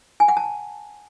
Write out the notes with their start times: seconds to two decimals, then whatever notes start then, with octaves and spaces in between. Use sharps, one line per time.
0.20 G#5
0.28 F#5
0.37 A5